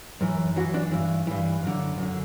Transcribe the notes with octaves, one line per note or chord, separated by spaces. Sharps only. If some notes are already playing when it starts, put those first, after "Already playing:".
F#2 E3
F#2 E3 F#4
D4
G2 E3
G2 E3
F#2 D3
F#2 D3